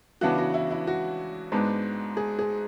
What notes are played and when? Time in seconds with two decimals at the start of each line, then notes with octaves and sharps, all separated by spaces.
0.21 C#3 E3 B3 D4 F#4
0.38 F#4
0.54 E4
0.71 E4
0.87 F#4
1.52 G#2 G#3 B3 D4
2.17 G#4
2.39 G#4